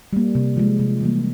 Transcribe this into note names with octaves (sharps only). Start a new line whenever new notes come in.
G3 A#3
C3
F3 G#3
C3
E3 G3 A#3